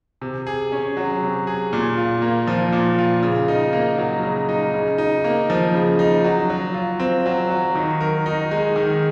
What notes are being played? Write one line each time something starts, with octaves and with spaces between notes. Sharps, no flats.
C3
G#4
C#4
F#3
C3
G#4
A#2
F4
A#3
F3
A#2
F4
C#3
D#4
A#3
F#3
C#3
D#4
C#3
D#4
A#3
F3
C#3
D#4
F#3
F#3
F4
C4
F#3
F#3
D#3
A#4
D#4
G#3
D#3